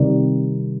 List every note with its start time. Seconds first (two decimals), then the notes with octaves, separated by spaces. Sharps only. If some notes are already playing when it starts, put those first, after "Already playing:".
Already playing: C3 D#3 G3